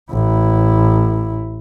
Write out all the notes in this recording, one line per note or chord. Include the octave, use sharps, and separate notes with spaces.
A1 E4